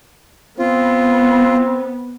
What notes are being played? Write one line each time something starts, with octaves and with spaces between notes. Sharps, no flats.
B3 C4 F4